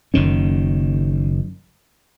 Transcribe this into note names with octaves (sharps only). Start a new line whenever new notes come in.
F#1 F#2 D#3 C#4